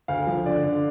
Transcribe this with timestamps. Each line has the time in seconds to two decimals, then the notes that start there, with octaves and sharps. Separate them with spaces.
0.08 D2 F5
0.27 F3
0.46 D3 D5
0.64 D3